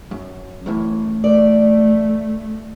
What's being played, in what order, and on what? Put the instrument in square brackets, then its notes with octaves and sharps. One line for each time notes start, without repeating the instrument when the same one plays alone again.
[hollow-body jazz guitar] F#2
F#2 A2 E3
[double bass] A3 [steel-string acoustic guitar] D5